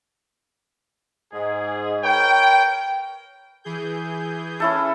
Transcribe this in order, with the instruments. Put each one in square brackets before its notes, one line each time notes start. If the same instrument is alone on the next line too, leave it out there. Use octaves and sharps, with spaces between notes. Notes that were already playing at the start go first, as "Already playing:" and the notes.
[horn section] G#2 G#4
A#4 B4 C#5 G5
[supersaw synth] E3 G#4 G6
[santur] C#4 E4 A4